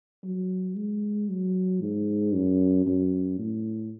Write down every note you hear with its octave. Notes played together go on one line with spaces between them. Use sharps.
F#3
G#3
F#3
G#2
F#2
F#2
A2